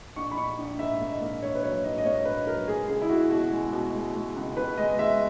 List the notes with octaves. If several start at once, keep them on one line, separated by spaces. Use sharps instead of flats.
A#1 C#6
B5
A#1 C#6
A#1
G#2 E5
A#3
D#5
A#3
A#1 C#5
B4
F#3 C#5
G#2 D#5
D#5
A#3 C#5
A#1 B4
F#3 A#4
G#3 G#4
C#2 G#4
E4
C#2 F#4
B2 F#4
G#3
B2
G#3
G#3
C#2
C#2 B4
G#3 D#5
G#3 E5